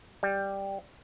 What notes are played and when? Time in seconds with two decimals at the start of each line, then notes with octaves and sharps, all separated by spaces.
0.23 G3